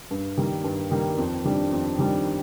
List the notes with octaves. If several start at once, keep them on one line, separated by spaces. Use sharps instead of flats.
G2
D#3 G3 A#3
G2
D#3 G3 A#3
F2
D#3 G3 D4
F2
D#3 G3 D4